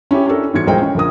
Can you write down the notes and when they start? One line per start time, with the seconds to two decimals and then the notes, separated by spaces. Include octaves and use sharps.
0.11 C#4 E4 G4
0.27 C#4 D4 G4 A4 A#4
0.54 G#2 E3 B3 F#4 G#6 C#7
0.67 A#1 G#3 A#4 C5 G5
0.81 C#4
0.95 A#1 D3 A#4 D#6